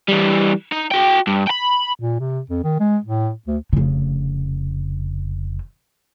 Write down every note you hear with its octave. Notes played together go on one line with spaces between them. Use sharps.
E3 G3
D#4
F#4 G5
G2
G5 B5
A#2
C3
F2
D#3
G#3
A2
D2
F1 C#3